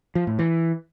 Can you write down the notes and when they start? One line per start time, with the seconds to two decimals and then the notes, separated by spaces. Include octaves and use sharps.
0.15 F3
0.27 A2
0.39 E3